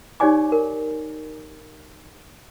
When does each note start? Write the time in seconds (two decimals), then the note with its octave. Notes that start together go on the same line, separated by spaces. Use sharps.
0.20 D#4 G4 C#5 D5 G#5 D6
0.52 A#4